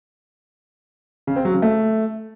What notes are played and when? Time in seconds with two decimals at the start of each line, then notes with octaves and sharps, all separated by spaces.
1.27 C#3
1.36 C4
1.45 F#3
1.54 C#3
1.62 A3